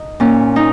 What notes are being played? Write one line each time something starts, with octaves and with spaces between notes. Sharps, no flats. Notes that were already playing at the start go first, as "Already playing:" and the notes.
Already playing: D#4
A#2 C#4
D#4